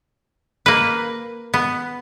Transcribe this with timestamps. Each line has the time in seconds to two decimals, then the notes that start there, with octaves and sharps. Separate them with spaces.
0.66 A#3 B4
1.54 B3